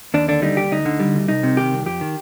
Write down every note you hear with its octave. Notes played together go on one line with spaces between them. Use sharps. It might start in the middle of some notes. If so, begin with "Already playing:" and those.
D#2 D4
D3 D4
G3 D#4
D#2 G4
D2 D#4
D3
G3
D2
C2 D#4
C3
D#3 G4
C2
F2 G4
D#3